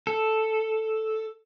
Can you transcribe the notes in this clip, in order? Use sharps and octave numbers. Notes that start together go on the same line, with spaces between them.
A4